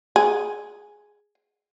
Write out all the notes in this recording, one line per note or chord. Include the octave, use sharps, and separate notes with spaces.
G#4